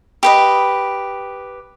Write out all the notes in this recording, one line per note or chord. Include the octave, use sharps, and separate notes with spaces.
G4 B4 D#5